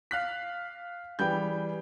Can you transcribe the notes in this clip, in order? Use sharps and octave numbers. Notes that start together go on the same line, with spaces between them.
F5 F#6 B6
E3 G3 G#4 G5 G6